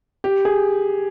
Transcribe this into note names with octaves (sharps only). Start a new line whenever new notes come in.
G4
G#4